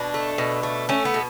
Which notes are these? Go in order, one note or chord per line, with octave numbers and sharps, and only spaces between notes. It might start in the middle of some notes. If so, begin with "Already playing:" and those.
Already playing: B2 D4
A3
B2
A3
A3 C#4
B3
B2